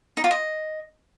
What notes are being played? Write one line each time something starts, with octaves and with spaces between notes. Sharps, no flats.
D#4
F4
D#5